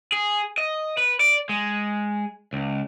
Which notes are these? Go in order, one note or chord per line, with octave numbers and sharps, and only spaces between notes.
G#4
D#5
B4
D5
G#3
C#2